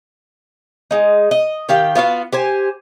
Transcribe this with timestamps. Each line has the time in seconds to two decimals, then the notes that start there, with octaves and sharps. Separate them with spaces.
0.91 G#3 D#4
1.31 D#5
1.69 D#3 G4 F5 G5
1.95 B3 F4 F#4 F5
2.32 G4 C5 G#5